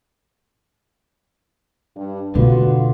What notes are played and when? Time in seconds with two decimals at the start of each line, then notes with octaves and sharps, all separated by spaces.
1.96 G2
2.35 B2 D3 A3 F4 F#4 B4